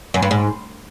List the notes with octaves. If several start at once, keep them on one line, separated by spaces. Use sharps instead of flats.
F#2
G2
G#2